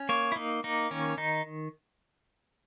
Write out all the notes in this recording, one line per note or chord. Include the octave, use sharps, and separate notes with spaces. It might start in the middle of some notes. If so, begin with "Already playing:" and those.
Already playing: C#4
A#3 C#5
E4
A#3 D#4
A#3 D#4
D#3 C#4
D#3 D#4